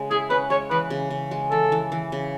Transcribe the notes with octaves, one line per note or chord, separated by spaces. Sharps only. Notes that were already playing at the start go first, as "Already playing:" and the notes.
Already playing: C#3 G#3
E4 G#4
C#4 B4
G#3 C#5
E3 B4
C#3
C#3
G#3
E3 A4
E3
E3
C#3